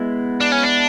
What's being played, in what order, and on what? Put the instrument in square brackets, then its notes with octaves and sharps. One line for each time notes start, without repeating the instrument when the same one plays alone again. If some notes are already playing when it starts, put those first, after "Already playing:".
Already playing: [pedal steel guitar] G#3 B3 E4
[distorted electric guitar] D4
C#4
D4